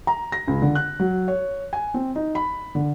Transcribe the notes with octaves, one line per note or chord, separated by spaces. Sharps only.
A#5
A#6
C#2
D3
F#6
F#3
C#5
G#5
C4
D#4
B5
D3